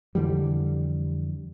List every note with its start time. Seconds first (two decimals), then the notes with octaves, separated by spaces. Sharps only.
0.15 F2 D3 E3 G3